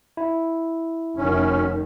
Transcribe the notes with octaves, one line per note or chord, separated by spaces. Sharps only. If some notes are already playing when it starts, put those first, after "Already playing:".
E4
F1 F#2 D#3 C#4